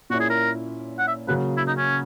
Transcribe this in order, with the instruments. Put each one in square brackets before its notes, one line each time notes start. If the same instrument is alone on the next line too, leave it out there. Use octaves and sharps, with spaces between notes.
[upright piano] A#2 A#3 C#4 E4 [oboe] F#4
[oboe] G#4
A#4
F#5
E5
[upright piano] C#3 F#3 A#3 [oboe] B4
[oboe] E4
D#4
C#4